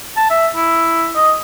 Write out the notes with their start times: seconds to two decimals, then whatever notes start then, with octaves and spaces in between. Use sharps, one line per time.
0.17 A5
0.30 E5
0.55 E4
1.15 D#5